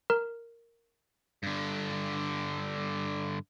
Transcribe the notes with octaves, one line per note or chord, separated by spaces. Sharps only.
A#4
G2 D3